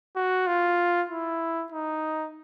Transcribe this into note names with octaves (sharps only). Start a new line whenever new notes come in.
F#4
F4
E4
D#4